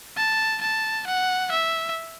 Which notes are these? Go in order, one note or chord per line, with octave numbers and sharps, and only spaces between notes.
A5
A5
F#5
E5